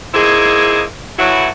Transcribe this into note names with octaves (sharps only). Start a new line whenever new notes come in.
A#3 C4 D#4 E4 G#4
A2 E3 F#3 E4 F#4